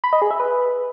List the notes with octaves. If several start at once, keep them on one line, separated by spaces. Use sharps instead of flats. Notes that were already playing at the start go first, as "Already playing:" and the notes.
B5
D#5
G#4
E5
B4